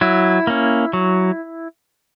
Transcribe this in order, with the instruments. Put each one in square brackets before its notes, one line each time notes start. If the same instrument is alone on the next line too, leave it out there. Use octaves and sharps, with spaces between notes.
[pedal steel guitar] F#3 E4
A#3 C#4
F#3